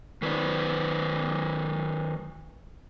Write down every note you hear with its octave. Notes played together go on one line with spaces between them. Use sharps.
D#3 B4 C5 D5